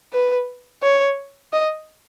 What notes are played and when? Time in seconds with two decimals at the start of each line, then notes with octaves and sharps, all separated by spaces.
0.13 B4
0.82 C#5
1.53 D#5